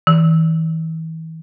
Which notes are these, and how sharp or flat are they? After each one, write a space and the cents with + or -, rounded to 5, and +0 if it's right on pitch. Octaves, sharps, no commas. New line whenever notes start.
E3 -35